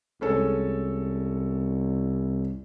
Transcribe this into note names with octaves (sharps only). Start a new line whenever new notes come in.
C2 G#3 C#4 A4